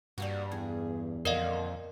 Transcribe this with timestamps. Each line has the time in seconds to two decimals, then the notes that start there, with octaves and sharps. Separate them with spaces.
0.18 G2 G3 A#3 F#4
0.52 E2 G#4
1.25 F2 A#2 D3 A#4 D#5 F5